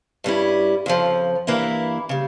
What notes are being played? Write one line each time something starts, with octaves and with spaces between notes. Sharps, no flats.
G2 G3 C#4 E4
F2 C#3 F3
G2 E3 A#3 E4
C#3 G3